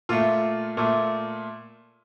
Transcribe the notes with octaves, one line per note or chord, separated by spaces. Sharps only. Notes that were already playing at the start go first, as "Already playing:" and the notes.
A#2 A3 F4
A#2 A3